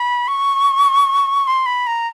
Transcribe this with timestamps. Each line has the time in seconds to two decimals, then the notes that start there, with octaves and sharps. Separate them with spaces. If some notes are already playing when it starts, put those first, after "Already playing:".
Already playing: B5
0.28 C#6
1.47 C6
1.66 B5
1.87 A#5